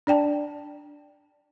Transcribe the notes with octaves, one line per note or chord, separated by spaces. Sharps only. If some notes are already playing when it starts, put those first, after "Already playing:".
D4 D5 G5 A5